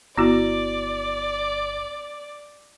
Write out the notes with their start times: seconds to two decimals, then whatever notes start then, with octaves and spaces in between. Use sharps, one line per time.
0.18 G1 B3 E4 F#4 D5